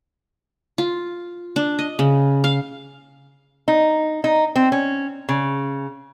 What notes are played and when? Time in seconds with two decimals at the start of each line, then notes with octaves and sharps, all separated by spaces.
0.78 F4
1.56 D4
1.79 D#5
1.99 C#3
2.44 F5
3.68 D#4
4.24 D#4
4.56 C4
4.72 C#4
5.29 C#3